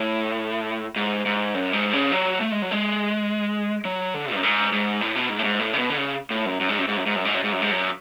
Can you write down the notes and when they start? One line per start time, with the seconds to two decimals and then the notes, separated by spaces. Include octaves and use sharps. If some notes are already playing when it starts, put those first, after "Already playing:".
Already playing: A2
0.96 G#2
1.26 G#2
1.54 F#2
1.73 G#2
1.93 C#3
2.12 F#3
2.41 A3
2.52 G#3
2.62 F#3
2.71 G#3
3.85 F#3
4.14 D3
4.34 F#2
4.43 G#2
4.72 G#2
5.01 A2
5.15 B2
5.29 G#2
5.39 A2
5.44 G#2
5.59 A2
5.73 C#3
5.79 B2
5.90 D3
5.97 C#3
6.30 A2
6.46 F#2
6.60 F#2
6.69 G#2
6.78 F#2
6.87 G#2
6.97 F#2
7.06 G#2
7.16 F#2
7.25 G#2
7.34 F#2
7.43 G#2
7.53 F#2
7.62 G#2
7.71 F#2